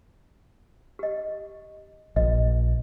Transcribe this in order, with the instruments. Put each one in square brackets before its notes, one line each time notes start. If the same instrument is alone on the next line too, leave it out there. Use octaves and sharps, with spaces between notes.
[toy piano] G4 D#5
[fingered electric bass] A#1 [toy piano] D#5